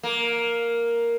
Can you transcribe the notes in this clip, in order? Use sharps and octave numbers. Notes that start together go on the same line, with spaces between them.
A#3